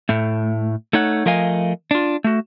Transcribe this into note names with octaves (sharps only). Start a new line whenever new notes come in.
A2 A3
A3 D#4 C#5 F#5
F3 A3 A#4 D#5 F5 G#5
D4 F4
A3 F#4